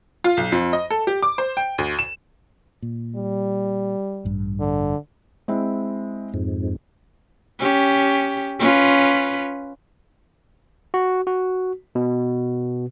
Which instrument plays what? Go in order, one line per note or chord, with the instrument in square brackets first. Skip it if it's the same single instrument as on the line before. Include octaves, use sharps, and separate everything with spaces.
[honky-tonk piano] F4
B1
F2
D#5
A4
G4
D6
C5
G5
D2
E7
[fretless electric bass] A#2
[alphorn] G3
[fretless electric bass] A1 G2
[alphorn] D3
[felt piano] G#3 C4 E4
[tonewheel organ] F2 G#2
[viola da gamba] C#4 G4
C#4 F4 B4
[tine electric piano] F#4
F#4
B2